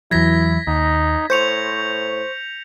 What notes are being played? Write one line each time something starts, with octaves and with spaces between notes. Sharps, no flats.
E2 E3 F#3 E4 G#6 A#6 B6
D#2 D#4
A2 C5 C#6 G6 C#7 F7